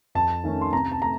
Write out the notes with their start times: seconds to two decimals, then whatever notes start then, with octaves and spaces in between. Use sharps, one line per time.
0.15 F2 A5
0.44 D#3 A3 C#4
0.61 C6
0.73 C3 A#5
0.92 A5
1.02 A3 A#5